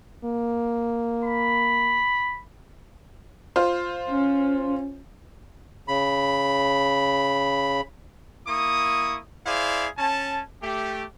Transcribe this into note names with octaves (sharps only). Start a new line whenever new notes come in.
A#3
B5
F4 C5
C#4
C#3 B5
A#3 E4 C#6 D#6
E4 G#4 C5 D5 F5
C#4 A5
A3 G4